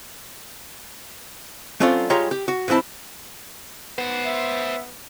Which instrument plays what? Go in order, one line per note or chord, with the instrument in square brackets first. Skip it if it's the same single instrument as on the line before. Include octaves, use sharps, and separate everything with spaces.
[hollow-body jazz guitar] F#3 A3 C4 C#4 F4 D5
G3 G#3 F4 G4 C#5 A#5
G4
F#4
G#2 E3 C4 E4 A5
[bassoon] B3 [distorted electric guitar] C5 F#5
[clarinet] E5